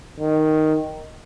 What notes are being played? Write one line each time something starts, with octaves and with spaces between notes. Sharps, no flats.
D#3